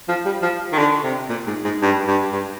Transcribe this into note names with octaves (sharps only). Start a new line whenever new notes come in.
F3
G3
F3
D#3
D3
C3
A#2
G#2
G#2
G2
G2
G2